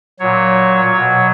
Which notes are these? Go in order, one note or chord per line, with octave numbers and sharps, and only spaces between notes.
A#2 F#3 C#5
B2 F#3